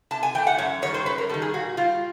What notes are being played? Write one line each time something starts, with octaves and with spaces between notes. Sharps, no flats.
C3 A5
G#5
E3 A3 G5
F#5
F#2 C#5
D#3 G3 C#5
C5
F#2 B4
A#4
D#3 G3 A4
G#4
A#2 F#4
G3 F4